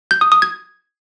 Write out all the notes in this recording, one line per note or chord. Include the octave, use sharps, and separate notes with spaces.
G6
D#6
D#6
G#6